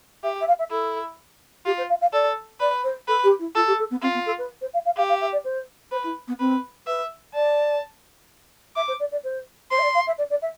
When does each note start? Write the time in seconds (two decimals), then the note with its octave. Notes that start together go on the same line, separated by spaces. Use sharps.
0.23 G4 E5
0.41 E5
0.48 F5
0.59 E5
0.71 E4 A4
1.66 F4 G4
1.78 C5
1.89 F5
2.01 F5
2.13 A4 D5
2.60 B4 D5
2.84 C5
3.08 A4 B4
3.23 G4
3.39 E4
3.55 F4 A4
3.67 G4
3.79 A4
3.91 B3
4.02 C4 F4
4.14 B3
4.26 A4
4.38 B4
4.61 C5
4.74 F5
4.85 F5
4.97 G4 F5
5.09 F5
5.21 E5
5.32 D5
5.44 C5
5.92 B4 C5
6.04 E4
6.28 B3
6.40 C4 B4
6.87 B4 E5
7.34 D5 A5
8.76 E5 D6
8.88 C5
9.00 D5
9.12 D5
9.24 C5
9.71 C5 C6
9.79 E5
9.83 D5
9.94 F5
10.07 E5
10.18 D5
10.30 D5
10.42 E5